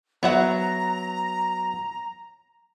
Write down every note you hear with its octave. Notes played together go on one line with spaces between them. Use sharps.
F#3 B3 C#5 E5 F#5 A#5